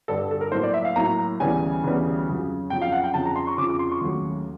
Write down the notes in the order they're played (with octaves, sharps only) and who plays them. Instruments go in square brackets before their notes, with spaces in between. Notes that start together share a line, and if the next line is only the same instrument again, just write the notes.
[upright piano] G2 D3 G3 A4
A4
A#4
A2 F#3 A#3 C5
D5
E5
F5
A2 F#3 A#3 A#5
D2 C#3 E3 G3 B3 G#5
D2 C#3 E3 G3 B3
F2 C#3 F#3
F2 C#3 F#3 G5
F5
F#5
G5
F2 C#3 F3 A5
A#5
C6
C#6
F2 C#3 F3 D6
D6
C6
C#6
D#2 C#3 F#3 A3